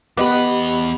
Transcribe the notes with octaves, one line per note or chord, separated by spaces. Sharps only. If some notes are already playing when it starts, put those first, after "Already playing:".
E2 B3 G4 D#5 B5 D6